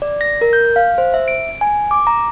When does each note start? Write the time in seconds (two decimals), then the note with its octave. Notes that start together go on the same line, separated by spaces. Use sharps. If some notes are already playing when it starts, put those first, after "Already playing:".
0.02 D5
0.21 A#6
0.41 A#4
0.53 G6
0.76 F5
0.98 C5
1.14 E5
1.28 D7
1.61 G#5
1.91 D6
2.07 A#5